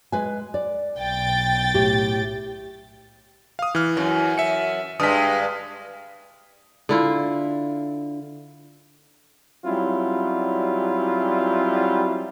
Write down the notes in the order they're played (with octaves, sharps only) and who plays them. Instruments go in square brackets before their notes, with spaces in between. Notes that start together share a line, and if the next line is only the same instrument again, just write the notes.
[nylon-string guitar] G#3 B4 G#5
D5
[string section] B1 G5 A6
[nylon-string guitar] A2 G4
[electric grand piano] F5 D#6
E3 F6
[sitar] F#2
[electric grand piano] E5 C#7
[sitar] G2 G#3 [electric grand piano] D#6 F6 B6
[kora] D3 E4 F4
[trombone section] F#3 G3 C4 C#4 E4 F4